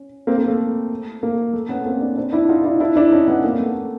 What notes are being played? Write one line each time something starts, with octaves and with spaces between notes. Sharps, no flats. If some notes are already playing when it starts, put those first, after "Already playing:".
Already playing: C#4
A#3 C4
A#3
A3
A#3
A3
B3 C#4
A#3 C4
C4 D4
C4 D4
D4 E4
D#4 F4
D4 E4
D4 E4
D4 E4
C#4 D#4
B3 C#4
A#3 C4
A3 B3
A#3